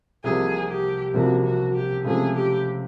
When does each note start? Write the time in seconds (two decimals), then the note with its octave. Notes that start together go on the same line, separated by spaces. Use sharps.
0.24 C2 C3 F3 A#3 G#4
0.69 G4
1.14 C2 C3 F3 A#3 F#4
1.45 F#4
1.75 G4
2.05 C#2 C3 F3 A3 G#4
2.35 G4